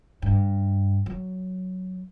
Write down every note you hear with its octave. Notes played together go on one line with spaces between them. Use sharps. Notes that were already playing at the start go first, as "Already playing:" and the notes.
G2
F#3